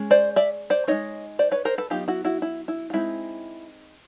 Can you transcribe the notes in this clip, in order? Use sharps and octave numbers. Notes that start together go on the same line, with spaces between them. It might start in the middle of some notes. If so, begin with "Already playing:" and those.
Already playing: G#3 C#4
C5 D5
D5 E5
C5 D5
G#3 C4 D#4 C#5 D#5
C5 D5
B4 C#5
A#4 C5
A4 B4
F#3 B3 D#4 F4 G4
E4 F#4
E4 F#4
E4
E4
F4
G#3 C4 D#4 E4